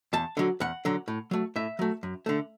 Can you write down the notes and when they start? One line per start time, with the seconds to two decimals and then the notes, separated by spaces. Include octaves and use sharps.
0.13 E2 A5
0.37 D3 F#3
0.60 E2 F#5
0.85 D3 F#3
1.08 A2
1.31 F#3 A3
1.56 A2 E5
1.79 F#3 A3
2.03 F#2
2.26 D3 A3